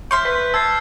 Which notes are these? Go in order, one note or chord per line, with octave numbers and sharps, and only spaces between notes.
E5 C6 C#6 F6 G6
B4
A5 E6 G#6 C7